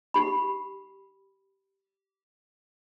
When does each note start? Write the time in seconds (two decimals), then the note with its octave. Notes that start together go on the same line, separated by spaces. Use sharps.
0.14 G4 B5